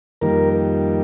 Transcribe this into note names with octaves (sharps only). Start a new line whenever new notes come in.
F2 D#3 G3 A#3 A#4